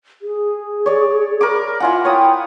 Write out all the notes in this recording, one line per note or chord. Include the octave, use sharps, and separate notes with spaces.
G#4
C#5 D5
A#4 B5 D6
E4 F4 F#5 G#5
C#5 G5 B5 D#6